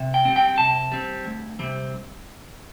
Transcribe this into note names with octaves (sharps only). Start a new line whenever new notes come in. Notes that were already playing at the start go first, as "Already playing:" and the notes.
Already playing: C3
G5
G3 C4
G5
C3 A5
G3 C4
D2
C3 G3 C4